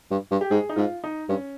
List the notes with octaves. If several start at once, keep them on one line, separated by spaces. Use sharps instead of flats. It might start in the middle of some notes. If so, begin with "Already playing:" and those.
G2
G2
G4
G#2 G#4
D#4
G#2 F4
D#4
G2 C#4